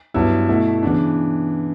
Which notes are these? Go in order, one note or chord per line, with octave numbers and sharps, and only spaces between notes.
G2 F#3 B3 E4
B2 A3 E4
C#3 E3 B3 D4